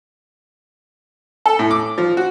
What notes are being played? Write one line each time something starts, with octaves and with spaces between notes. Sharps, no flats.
A4
A2
D6
F3
F#4